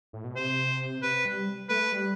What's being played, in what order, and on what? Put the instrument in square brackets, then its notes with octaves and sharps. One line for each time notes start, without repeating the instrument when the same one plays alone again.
[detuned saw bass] A2
B2
[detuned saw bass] C3 [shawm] C5
[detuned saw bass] C3 [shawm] B4
[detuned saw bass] G3
[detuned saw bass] A3 [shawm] B4
[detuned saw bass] G3